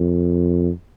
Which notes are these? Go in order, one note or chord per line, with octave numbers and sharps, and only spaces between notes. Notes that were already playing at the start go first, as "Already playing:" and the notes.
Already playing: F2